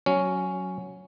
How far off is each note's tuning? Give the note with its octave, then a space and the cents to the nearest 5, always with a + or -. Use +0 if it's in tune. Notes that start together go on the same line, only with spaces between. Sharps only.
F#3 +0 C#4 +5